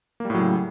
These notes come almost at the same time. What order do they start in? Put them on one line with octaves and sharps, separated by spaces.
A#3 G3 A2 F#3 C#3